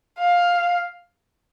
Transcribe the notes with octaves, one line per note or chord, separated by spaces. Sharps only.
F5